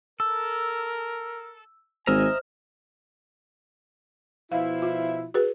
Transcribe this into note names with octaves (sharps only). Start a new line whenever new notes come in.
A4 A#4 E6
G#1 C5 D#5 E5 G#5 A#5 F6
B2 F3 E4 F5
F4
F#4 G#4 B4